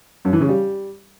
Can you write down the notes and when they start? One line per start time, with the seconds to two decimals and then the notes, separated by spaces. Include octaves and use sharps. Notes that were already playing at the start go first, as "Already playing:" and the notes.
0.25 F#2
0.33 E3
0.41 C#3
0.49 G3